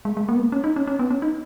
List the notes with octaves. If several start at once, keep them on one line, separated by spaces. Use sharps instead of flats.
G#3
G#3
A#3
B3
A#3
C#4
D#4
C#4
C#4
B3
C#4
D#4